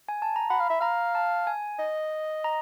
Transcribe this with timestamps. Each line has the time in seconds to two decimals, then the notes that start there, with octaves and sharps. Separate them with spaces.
0.09 G#5
0.22 A5
0.36 A#5
0.50 F#5 B5
0.60 F5
0.70 E5
0.80 F5 A#5
1.15 A5
1.47 G#5
1.79 D#5
2.44 A#5